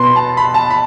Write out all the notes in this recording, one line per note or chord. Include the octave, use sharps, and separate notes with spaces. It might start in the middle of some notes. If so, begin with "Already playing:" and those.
Already playing: B2 B3 B5 C6
A5
B5
A5
B5